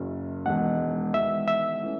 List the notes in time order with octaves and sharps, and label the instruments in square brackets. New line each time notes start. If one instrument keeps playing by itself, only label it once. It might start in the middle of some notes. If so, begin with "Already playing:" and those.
Already playing: [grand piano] F#1 F#2 C#3
[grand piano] E1 E2 D#3 G#3 [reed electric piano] F#5
[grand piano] E1 E2 D#3 G#3 [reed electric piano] E5
[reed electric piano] E5
[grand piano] E3 A3 C#4